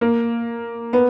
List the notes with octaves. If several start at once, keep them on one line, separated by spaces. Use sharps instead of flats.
A#3
B3